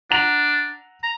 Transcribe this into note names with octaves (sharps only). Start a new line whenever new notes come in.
D4 F#5 A#5 F7
A#5